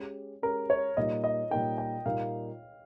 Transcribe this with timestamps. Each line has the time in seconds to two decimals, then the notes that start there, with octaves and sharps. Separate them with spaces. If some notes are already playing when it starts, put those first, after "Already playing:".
Already playing: G#3 C#4 G4
0.42 G#3 C#4 G4 A#4
0.70 C#5
0.97 A#2 G3 A#3 D#4 D#5
1.24 D#5
1.51 A#2 G3 A#3 D#4 G5
1.78 G5
2.05 A#2 G3 A#3 D#4 F5